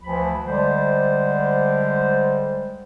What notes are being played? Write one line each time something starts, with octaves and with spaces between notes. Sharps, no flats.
D2 E3 F3 B5
D3 G3 G#3 C5